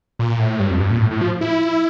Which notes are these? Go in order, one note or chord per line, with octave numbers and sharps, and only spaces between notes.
A#2
A2
G2
F2
G2
A#2
A2
A2
F3
E4